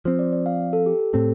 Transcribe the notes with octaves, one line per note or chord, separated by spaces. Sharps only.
F3 C4 C5
D5
D5
F5
A4
G4
G4
A2 A3 C4 A4